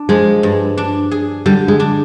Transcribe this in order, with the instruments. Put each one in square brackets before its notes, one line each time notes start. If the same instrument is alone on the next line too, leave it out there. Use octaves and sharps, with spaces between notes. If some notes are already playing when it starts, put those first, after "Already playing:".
Already playing: [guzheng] D4
[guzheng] F3 [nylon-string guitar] G#3
[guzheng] G2
D4
G#4
[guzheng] D3 [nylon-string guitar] G3
[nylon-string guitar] G#3
[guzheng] D4